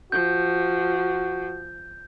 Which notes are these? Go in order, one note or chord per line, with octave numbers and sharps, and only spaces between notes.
F3 F#4 G6